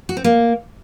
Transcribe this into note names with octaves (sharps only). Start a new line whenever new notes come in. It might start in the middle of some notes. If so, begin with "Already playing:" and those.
F#4
C4
A#3